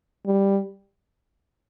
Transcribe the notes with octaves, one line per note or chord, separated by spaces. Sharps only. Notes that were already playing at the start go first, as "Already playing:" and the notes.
G3